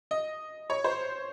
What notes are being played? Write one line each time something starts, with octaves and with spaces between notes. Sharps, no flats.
D#5
C#5
C5